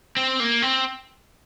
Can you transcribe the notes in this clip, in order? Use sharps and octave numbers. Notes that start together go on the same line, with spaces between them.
C4
A#3
C4